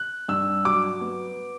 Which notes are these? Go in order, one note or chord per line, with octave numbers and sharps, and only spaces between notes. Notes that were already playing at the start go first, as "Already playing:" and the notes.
Already playing: F#6
G2 E6
F#3 D6
B3